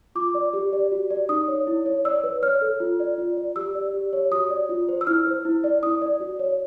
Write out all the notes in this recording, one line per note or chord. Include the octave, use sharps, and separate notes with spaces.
F4 D6
D5
G4
D5
F#4
D5
D#4 D#6
C#5
E4
C#5
D5 E6
B4
C#5 F6
A4
F4
D5
F4
D5
G4 E6
D5
G4
C#5
F#4 D#6
D5
F4
C5
E6
E4 F6
C5
E4
D5
E4 D#6
D5
F#4
C#5